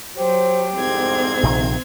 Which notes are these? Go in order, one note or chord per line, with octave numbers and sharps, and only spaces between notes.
F#3 G4 C5
C2 F2 G#2 C4 G#6
A#1 C3 D#3